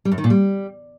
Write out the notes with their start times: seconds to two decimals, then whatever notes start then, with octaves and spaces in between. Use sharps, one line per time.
0.05 G3
0.12 F#2
0.18 D#3
0.24 A#2
0.30 G3